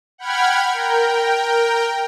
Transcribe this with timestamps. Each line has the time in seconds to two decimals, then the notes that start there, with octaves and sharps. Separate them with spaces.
0.18 F#5 G5 B5 F6 G#6
0.74 A#4 G5